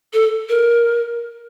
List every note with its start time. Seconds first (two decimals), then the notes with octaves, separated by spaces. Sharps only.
0.14 A4
0.49 A#4